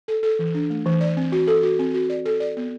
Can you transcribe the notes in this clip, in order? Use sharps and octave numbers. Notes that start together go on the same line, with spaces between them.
A4
A4
E3
D4
A3
E3
D5
C4
F#4
A4
F#4
C4
F#4
D5
A4
D5
B3